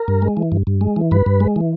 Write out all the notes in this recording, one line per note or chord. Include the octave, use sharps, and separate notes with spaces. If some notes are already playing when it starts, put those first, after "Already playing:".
Already playing: A#4
G2
G#3
E3
G2
G2
G#3
E3
G2 B4
G2
G#3
E3